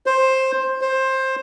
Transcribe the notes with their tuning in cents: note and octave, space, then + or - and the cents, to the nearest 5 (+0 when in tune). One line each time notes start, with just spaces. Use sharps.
C5 +10
C5 +15